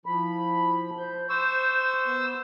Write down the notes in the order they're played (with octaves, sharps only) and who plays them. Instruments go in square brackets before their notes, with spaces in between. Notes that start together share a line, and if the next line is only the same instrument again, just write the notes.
[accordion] F3 B5 [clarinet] E4
[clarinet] C5 [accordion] G6
[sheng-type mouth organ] C5 E6 [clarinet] C#6
[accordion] B3